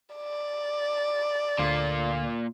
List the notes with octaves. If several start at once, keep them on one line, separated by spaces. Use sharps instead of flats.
D5
D2 A#2 D3 F4